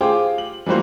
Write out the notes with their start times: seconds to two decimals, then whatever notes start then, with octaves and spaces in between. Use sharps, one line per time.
0.01 F4 G4 G#4 C5 D6
0.38 F#7
0.66 E3 F3 G3 A#3 F#4 C5